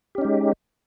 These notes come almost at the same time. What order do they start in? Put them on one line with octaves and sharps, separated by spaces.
G4 C#4 D#4 G#3